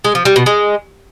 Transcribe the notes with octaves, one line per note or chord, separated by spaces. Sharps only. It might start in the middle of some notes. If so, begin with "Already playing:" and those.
G#3
F3
G3
B2
G#3